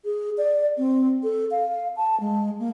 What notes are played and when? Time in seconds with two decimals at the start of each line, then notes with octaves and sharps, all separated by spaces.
0.05 G#4
0.38 D5
0.78 C4
1.23 A4
1.51 F5
1.96 A5
2.20 G#3
2.59 A#3